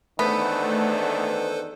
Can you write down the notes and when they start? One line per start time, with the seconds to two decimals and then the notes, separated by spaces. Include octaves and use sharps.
0.19 E2 D#3 A3 B3 D4 A4 B4 C5